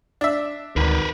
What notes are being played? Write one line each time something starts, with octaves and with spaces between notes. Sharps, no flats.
D4 E5
G#1 D2 D#3 A#4 B4